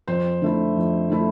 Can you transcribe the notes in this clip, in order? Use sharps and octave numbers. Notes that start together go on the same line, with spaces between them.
F2 C5
D3 A3 E4
F2
D3 A3 E4